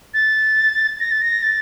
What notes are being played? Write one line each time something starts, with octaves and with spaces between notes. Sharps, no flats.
A6
A#6
A6
A#6
A6